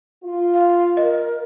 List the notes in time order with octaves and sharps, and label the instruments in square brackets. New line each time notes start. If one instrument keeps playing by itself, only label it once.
[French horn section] F4
[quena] F5
[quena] A#4 [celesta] D#5